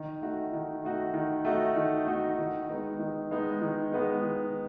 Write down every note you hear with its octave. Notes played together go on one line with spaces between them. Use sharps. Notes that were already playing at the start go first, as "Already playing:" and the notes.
Already playing: D#3
A3 D#4 F#4
D#3
A3 D#4 F#4
D#3
A3 D#4 F#4
D#3
A3 D#4 F#4
D#3
G#3 B3 D#4
D#3
G#3 B3 D#4
D#3
G#3 B3 D#4
D#3